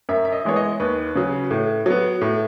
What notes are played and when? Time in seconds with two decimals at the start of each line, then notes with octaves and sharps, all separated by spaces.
0.09 F#2 E5
0.25 E5
0.32 D#5
0.45 E3 G#3 B3 C#5
0.56 D#5
0.80 D#2 B4
1.15 C#3 F#3
1.51 A2
1.86 F#3 B3
2.21 A2